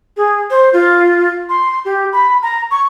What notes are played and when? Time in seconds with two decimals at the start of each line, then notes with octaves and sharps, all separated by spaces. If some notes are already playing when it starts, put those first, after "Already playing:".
0.17 G#4
0.50 C5
0.73 F4
1.49 C6
1.85 G4
2.13 B5
2.42 A#5
2.71 C#6